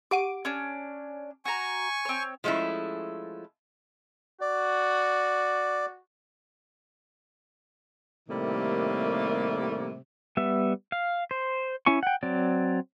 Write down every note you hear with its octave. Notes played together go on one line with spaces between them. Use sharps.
G4 F#5 D6 D#7
C#4 D4
F#4 G#5 A#5 C#6
C4 C#5
F3 G#3 A3 C#4 E4
F#4 D5
A2 C3 D#3 G3 A3 A#3
G3 B3 E5
F5
C5
C#4 E4 G#5 C#6
F#5 G5
F#3 C4 D5